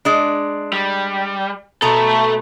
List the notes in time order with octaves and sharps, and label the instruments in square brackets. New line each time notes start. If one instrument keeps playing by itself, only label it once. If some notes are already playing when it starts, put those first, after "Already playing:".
[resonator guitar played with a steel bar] G#3 D4
[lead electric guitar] G3
[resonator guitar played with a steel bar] B2 A#5 [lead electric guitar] A3 A4